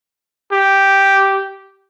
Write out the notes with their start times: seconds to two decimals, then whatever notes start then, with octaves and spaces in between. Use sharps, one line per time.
0.52 G4